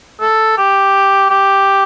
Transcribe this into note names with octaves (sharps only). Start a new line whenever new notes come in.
A4
G4
G4